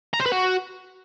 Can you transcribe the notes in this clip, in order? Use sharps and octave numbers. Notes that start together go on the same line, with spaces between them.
A#5
C5
B4
F#4